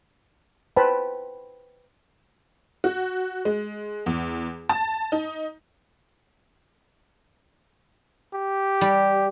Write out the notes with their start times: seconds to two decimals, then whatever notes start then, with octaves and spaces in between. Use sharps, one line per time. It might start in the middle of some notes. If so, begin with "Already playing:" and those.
0.77 B4 C5 G5 A5 B5
2.84 F#4
3.45 G#3
4.06 E2
4.69 A5
5.12 D#4
8.34 G4
8.81 G3